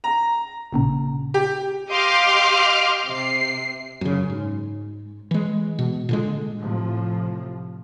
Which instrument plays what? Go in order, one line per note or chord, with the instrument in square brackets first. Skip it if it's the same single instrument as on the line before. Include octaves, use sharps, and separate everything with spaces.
[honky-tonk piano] A#5
[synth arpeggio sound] A1 A#2 C#3
[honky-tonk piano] G4
[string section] G4 D#5 F5 C6 D6 F6
C3 C7
[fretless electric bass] F#2 C#3
G#2
E3 G#3
B2
A#2 D3 G#3
[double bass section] A2 C3 F3